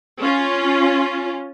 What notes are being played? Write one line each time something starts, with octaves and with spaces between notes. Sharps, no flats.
C#4 F4